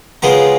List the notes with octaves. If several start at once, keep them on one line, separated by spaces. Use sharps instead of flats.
C#3 G#3 B3 F4 A#4